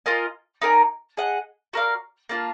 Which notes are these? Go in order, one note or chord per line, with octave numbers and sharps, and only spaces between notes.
F4 A#4 D#5 G#5
D#4 A#4 D5 G#5
G#4 D#5 F#5
F#4 A#4 D5 F5
A#3 D4 F4